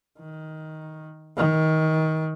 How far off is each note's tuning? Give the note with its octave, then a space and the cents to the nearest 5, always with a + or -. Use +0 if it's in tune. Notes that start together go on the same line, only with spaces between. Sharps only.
D#3 +10
D#3 +25